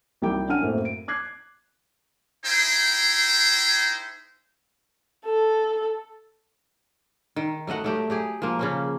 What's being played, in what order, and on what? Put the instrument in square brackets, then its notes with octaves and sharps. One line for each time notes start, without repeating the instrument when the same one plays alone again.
[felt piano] C2 F#3 G3 D#4 G5 D6
C#4 D4 F#5 F6 D#7
F#2 A2 A#3 C4
D7
D6 F#6 G#6 C7
[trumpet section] D#4 E4 G#4 C5 G5
[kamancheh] A4
[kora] D#3
F#3 A3 D#5 F#5
F#3 A3 G4
F#3 G4 G#4
F3 A#3
C#3 A#3 C#4